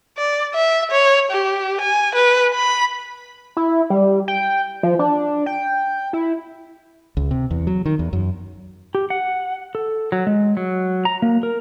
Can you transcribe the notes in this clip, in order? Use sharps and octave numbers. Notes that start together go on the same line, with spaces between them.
D5
E5
C#5
G4
G#5
B4
B5
E4
G3
G5
F3
D4
G5
E4
C#2
C3
E2
F#3
D#3
E2
F#2
G4
F#5
A4
F#3
G#3
F#3
A#5
A#3
A#4